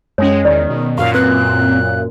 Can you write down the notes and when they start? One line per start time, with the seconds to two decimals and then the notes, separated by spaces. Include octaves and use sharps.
0.18 F#2 G#3 C#4 C#5
0.45 E2 D#3 D5
0.70 B2
0.98 F#2 A#2 F5 C#6
1.14 C4 B4 F#6